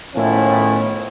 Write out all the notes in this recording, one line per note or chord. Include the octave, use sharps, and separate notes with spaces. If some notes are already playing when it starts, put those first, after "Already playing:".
A2 D#3 F3 B3 C#4 E4